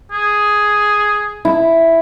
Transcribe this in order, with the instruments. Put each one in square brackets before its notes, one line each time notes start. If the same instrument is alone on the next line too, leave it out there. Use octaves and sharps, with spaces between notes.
[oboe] G#4
[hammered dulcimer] E4